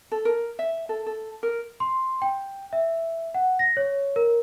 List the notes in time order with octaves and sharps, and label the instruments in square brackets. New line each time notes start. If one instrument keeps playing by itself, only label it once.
[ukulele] A4
A#4
E5
A4
A4
A#4
[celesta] C6
G5
E5
F#5
A#6
C#5
A#4